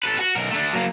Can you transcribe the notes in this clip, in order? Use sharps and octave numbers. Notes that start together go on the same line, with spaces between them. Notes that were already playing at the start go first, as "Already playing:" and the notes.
A4 B4
F#4
B1 A#4
A3 D4
F#3 A#3